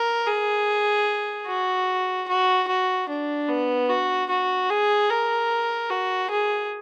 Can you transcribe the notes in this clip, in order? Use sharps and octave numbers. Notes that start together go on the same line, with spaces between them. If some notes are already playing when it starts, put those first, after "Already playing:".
Already playing: A#4
G#4
F#4
F#4
F#4
D4
B3
F#4
F#4
G#4
A#4
F#4
G#4